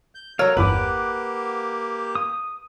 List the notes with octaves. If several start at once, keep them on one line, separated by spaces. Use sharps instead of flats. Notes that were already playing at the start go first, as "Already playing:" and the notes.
G6
F#3 A4 A#4 C#5 F5 E6
G1 E2 G2 A#3 G4 B4 F#5 D6
D#6